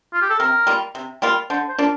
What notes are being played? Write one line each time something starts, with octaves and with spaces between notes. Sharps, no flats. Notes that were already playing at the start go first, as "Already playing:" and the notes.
F4
G4
A4
C3 A#4
G3 A#3 F4
C3
G3 A#3 F4
D3 C5
C5
F3 A#3 D4